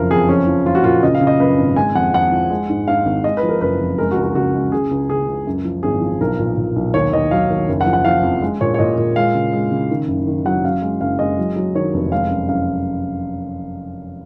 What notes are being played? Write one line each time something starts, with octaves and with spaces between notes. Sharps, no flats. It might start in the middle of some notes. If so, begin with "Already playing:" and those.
Already playing: F#1 F2 F3 A#4 F5
F2 G#4
F3 C#4
F3
F3 F4
F#4
A#2 F4
C#3 D#5
F5
C#3
D#5
F#2 B4
G#1
G#3 G#5
F2 F#5
F2 F#5
F3
G#3
G#2
G#2 F5
G#1
G#3 D#5
B4
F3
A#4
F#1 B4
F2
G#3 A#4
F#4
C#2
F#4
C#3 F#4
G#3
C#3 G#4
C#2
C#3 G#4
C#2
F#2
F3
G#1 G#4
F3
B1 A#4
A#2
A#2
B1
D#2 C#5
D#2 D#5
F#3 F5
D#2
F#1
F#5
F3
F#5
F3 F5
F2
G#3
A#2 C#5
C#5
A#2 D#5
A#2
G#3 F5
C#3
G#3
C#3
D#3
F#1
D#3
F#3 F#5
F#2 F5
G#3
F#1 F5
G#3 D#5
F#3
F#3
D#3 C#5
F1
G#3 F5
F#2
F#2 F5